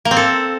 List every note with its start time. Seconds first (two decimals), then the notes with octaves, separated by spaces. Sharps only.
0.05 A#3
0.11 C4
0.17 A4